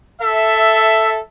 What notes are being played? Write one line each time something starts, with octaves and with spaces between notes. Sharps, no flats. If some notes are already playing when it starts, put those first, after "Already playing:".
A4 E5